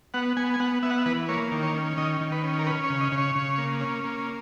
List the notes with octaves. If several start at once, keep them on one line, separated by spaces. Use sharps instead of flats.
B3 F#5
B3 G#5
G#5
B3 F#5
B3 E5
F#5
E5
E3 B4
A#3 C#5
D#3
C#5
C#4
D#3 D#5
D#3
B4
C#4
A#4
C#4 B4
C#5
C#3
D#5
C#3
C#5
C#3
A#3
C#4
A#3